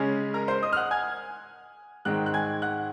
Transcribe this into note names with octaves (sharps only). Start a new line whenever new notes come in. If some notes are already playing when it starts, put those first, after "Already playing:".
Already playing: C#3 G#3 C#4 G#4 G#5
A#4 A#5
C5 C6
D#5 D#6
F6
F#5 F#6
G#5 G#6
G#2 D#3 G#3 C4 F#5 F#6
F#6
G#5 G#6
F#5 F#6